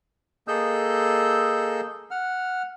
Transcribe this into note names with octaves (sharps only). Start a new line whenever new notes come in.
A#3 G#4 A4 D#5 E6 G6
F#5 F6